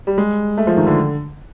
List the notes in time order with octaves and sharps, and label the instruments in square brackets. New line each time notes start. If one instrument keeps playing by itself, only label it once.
[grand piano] G3
G#3
A3
F3
D#3
D3